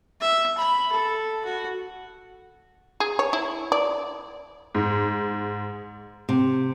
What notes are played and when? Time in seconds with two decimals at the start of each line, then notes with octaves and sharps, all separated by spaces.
0.21 E5
0.57 B5
0.92 A4
1.44 F#4
3.00 G#4
3.19 C#5
3.33 E4
3.72 D5
4.75 G#2
6.29 C3